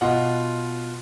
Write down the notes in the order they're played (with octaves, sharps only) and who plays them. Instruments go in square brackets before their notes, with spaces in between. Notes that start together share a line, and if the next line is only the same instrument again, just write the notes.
[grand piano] B2 F4 D#5 F#5